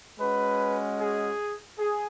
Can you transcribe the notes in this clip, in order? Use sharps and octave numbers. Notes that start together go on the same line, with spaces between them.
G#3 C#4 F#4 B4
G#4
G#4